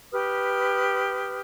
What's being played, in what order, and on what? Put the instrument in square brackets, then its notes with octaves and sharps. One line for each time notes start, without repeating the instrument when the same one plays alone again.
[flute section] G4 B4 D#6 F6